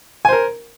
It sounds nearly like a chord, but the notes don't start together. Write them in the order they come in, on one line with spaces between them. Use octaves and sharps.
G#5 C5 A#4